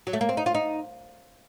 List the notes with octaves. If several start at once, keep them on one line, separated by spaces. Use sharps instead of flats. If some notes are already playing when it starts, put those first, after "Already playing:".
F#3
A3
A#3
C4
D#4
F4
D#4